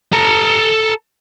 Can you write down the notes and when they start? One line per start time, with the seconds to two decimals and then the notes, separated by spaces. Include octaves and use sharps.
0.13 A4 A#5